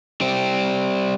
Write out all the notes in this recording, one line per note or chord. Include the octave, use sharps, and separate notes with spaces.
G3 C4